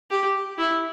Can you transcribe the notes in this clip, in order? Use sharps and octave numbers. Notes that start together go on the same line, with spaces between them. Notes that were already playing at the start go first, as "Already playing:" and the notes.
G4
E4